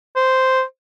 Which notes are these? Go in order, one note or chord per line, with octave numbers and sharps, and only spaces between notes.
C5